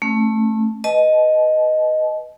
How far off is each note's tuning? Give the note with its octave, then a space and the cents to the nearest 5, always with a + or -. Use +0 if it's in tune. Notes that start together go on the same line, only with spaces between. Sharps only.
A3 +0 C#4 -30
B4 +0 D#5 +0 A5 -35